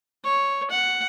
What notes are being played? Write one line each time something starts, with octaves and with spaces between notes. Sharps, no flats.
C#5
F#5